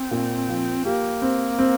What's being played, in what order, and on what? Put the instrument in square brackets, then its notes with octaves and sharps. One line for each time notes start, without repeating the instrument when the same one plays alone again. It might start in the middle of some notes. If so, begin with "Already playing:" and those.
Already playing: [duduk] C4
[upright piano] A#2
F3
[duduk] A#3 [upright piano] G4
[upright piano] C4
C4